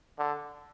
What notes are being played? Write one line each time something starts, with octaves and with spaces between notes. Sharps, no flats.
D3